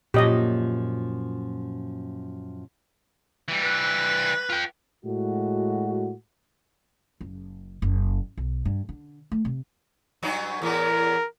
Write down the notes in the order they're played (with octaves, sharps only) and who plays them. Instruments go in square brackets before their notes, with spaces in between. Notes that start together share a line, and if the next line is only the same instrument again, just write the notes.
[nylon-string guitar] F#2 F3 [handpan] A#2 [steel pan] G4 D#5
[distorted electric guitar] E3 G3
[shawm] B4
[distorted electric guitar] F4 G5
[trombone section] A2 G#3 F#4
[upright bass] F#1
F#1
B1
G2
D3
A3
C3
[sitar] G2 F#3 D#4
[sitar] E2 A2 B3 [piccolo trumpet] A#4